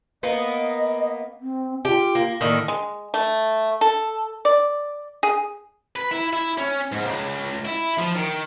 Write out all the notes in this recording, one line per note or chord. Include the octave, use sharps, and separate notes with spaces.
A#3 B3 D#5
C4
F4 G4
A#3
A2 D3 D#3 A#3
G#3
A3
A4
D5
G#4
B4
E4
E4
C#4
G#2
C#2
E4
F3
D#3